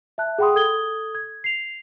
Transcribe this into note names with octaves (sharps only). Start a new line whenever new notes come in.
E5 A5 F#6
G#4 F#5 G5 B5 C6 D#6
A4 D#6 G#6 G7
G#6
C7 F7